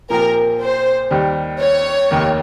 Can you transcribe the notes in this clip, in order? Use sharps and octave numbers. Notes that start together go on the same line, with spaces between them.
A#2 F3 C4 G4 A#4
C5
D#2 D#3 G3
C#5
F1 D#2 D#3 A#3